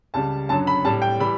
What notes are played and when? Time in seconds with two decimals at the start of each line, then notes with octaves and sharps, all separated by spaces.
0.14 C#2 C#3 G3 A5
0.49 F#2 D3 F#3 A5
0.67 B5
0.85 A2 G3 A5
1.02 G5
1.20 E3 G3 B5